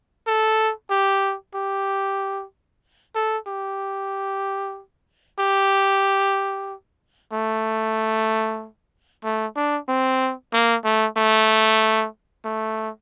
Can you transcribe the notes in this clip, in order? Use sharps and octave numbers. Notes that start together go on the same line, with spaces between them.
A4
G4
G4
A4
G4
G4
A3
A3
D4
C4
A#3
A3
A3
A3